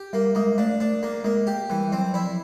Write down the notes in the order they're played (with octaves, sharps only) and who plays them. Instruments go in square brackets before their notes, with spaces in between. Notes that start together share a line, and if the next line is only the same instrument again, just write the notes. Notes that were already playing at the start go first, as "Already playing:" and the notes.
Already playing: [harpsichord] G4
[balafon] G3 [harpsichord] A#3
[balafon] G#3 [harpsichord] A#3
[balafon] A3 [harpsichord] D4
[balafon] A3 [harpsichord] D4
[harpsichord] A#3
[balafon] G#3 [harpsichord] A#3
[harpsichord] G4
[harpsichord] E3 [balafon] G3
[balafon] F#3 [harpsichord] C4
[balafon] F3 [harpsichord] E4